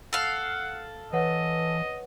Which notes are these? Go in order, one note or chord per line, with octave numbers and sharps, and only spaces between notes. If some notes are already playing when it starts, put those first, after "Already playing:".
A4 F5 F#5 F#7
E3 B4 C#5 D#5 F#5